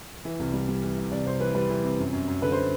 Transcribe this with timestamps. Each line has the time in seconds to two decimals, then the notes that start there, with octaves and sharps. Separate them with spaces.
0.25 E3
0.39 C2
0.54 G3
0.68 G3
0.83 E3
0.97 C3
1.12 C2 D5
1.27 C2 C5
1.40 E3 B4
1.55 G3 B4
1.70 E3
1.84 C3
1.98 F#2
2.13 F#2
2.28 F#2
2.42 D3 B4
2.52 C5